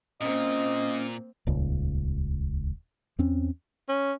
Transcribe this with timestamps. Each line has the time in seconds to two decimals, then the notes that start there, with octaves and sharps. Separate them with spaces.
0.21 A#2 A#3 C4 C#4 D#5
1.47 D#1 C#2
3.19 E2 C4 C#4
3.89 C#4